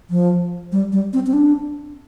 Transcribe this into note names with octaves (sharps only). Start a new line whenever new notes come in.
F3
G3
G3
C4
C4
D4